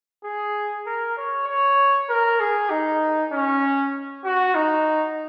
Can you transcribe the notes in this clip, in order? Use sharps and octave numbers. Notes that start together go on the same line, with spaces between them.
G#4
A#4
C#5
C#5
A#4
G#4
D#4
C#4
F#4
D#4